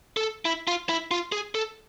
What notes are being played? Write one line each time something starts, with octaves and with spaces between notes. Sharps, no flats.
A4
E4
F4
E4
F4
G#4
A4